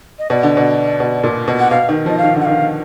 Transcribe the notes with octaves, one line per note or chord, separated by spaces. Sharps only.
D#5
B2 D5
D3
B2
B2
A#2
B2
F#5
B2 F5
D#3
F3
D#5
F5
D#3
D3
F#5
D#3 F5